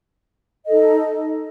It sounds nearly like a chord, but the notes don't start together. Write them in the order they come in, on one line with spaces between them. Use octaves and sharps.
D#5 A4 D#4